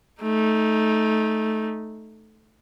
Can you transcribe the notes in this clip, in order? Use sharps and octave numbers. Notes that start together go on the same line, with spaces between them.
A3 D#4